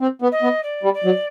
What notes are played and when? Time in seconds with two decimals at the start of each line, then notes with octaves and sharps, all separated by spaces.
0.01 C4
0.22 B3
0.32 D#5
0.42 B3
0.63 D5
0.83 G3
0.94 D5
1.04 F#3